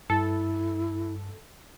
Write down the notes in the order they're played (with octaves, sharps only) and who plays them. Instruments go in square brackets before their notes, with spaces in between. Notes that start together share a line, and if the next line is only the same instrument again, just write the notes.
[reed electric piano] G2 [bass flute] E4 [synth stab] A4